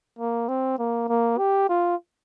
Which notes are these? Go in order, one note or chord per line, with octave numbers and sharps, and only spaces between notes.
A#3
C4
A#3
A#3
G4
F4